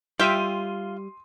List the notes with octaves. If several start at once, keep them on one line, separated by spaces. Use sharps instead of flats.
G3 F4 E5 G5 C6 D#7